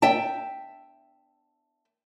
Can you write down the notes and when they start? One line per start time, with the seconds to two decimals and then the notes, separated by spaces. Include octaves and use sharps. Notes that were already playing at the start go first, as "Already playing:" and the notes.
0.02 E5 G5 A5